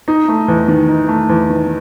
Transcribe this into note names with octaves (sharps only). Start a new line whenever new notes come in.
D#4
A3
E2
D#3
D#4
A3
E2
D#3